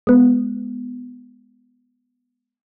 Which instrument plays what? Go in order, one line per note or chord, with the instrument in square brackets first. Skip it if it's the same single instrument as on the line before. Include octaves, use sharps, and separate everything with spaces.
[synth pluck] G#3 B3